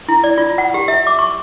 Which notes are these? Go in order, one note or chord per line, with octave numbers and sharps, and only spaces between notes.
E4
D5
F4
F#5
G4
E5
D6
C#6